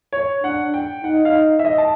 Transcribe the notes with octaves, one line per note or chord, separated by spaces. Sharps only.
C#5
D4 F#5
G5
D#4 F#5
F5
E5
D#5
A5